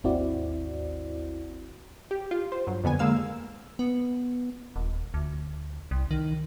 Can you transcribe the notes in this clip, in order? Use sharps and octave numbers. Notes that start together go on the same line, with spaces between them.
G#1 D#2 C4 E4 F#4 D5
G4
F4
C5
G2 F#3
F2 D3 B3 G#5
D3 G#3 A#3 F5 E6
B3
D#1
D2
C2
D#3